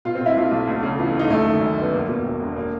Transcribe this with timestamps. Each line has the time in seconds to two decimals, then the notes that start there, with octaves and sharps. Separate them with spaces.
0.05 B2 F4
0.15 C4
0.21 B2
0.26 E4
0.36 B1 F4
0.51 B1
0.67 D2
0.83 C#3
0.99 E3 F4
1.15 D2 D#4
1.30 F#2 A3
1.46 D#3
1.61 F#2
1.77 G1 B3
1.93 E2 A#3
2.09 B2
2.24 E1
2.40 E1
2.56 A#3